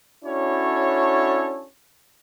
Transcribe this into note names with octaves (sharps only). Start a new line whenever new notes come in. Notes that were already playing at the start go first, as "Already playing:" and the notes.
C#4 D4 E4 F#4 A4 C#5